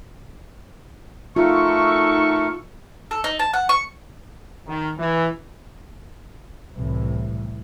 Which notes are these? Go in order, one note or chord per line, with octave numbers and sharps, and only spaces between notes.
A3 D#4 F4 F#4 A4 A#4 C#6
A4
D#4
A5
F#5
C#6
D#3
E3
C2 A2 E3